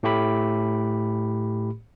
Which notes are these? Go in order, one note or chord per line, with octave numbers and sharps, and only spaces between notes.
A2 A3 G4 B5